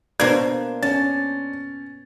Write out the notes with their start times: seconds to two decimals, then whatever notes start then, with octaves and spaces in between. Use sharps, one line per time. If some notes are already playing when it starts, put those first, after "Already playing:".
0.20 B2 A#3 D4 C5 G#6
0.83 C#4 A5 A6